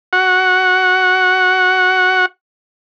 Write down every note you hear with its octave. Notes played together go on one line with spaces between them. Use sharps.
F#4 F#5